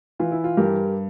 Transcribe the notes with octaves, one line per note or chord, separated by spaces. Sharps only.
E3 F4
E4
F4
G2 G4 A#4